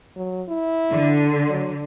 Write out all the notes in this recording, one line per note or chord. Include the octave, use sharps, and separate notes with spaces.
F#3
E4
D3
F#3